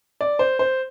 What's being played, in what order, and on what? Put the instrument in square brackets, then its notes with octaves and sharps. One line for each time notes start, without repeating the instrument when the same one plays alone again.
[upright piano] D5
C5
C5